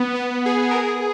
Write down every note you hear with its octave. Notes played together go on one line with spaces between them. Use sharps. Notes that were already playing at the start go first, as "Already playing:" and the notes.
Already playing: B3
B3
G#4
A#4
G#4